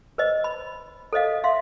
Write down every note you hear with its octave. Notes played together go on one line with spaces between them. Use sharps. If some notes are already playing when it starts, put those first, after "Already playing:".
B4 C5 D#5
B5
A4 C5 D#5 F5
E5 F5 C6